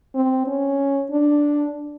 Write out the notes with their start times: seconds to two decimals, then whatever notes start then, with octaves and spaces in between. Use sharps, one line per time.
0.15 C4
0.47 C#4
1.11 D4